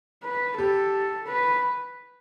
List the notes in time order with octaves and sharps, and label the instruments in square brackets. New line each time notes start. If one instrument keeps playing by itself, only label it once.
[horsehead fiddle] B4
[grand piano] G4 [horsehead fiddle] A4
[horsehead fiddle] B4